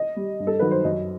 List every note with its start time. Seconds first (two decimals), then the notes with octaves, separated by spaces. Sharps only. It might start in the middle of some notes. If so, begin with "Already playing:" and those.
Already playing: D#5
0.16 G3
0.40 G2
0.47 A4
0.59 D#3 F#3 B4
0.71 C5
0.84 F#2 D#5